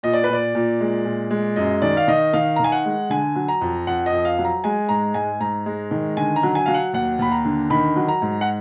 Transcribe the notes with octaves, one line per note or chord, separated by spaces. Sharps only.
A#2 D#5
D5
B4
A#2 D5
A#2
G#3
A#2
G#3
F#2 D#5
D#3 D5
F5
D#3 D#5
D#3 F5
A#5
D#3 G#5
F#5
G#3
D3 G#5
F#3
A#5
F2
F2 F#5
D#5
F2
F5
F#3
A#5
G#3 G#5
G#2 A#5
G#2 G#5
G#2 A#5
G#3
D#3
D3 G#5
A#5
F#3
G#5
F#3 F5
F#5
D#2 F#5
D#2 B5
A#5
D3
D#3 B5
F#3
A#5
G#2
F#5